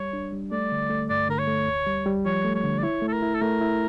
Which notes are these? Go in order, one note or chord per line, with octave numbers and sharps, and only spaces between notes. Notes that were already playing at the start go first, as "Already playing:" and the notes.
Already playing: G3 C#5
D4
G3
A3 D5
D3
A3
G2 D5
D3 A#4
C#5
A3
D2
G3
G3
F3 C#5
A3
C#5
D3
D5
E4 C#5
A3
A4
A#4
E4
A4
A3 A#4
E4